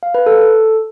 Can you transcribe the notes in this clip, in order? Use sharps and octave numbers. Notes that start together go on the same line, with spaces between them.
F5
B4
A4
A4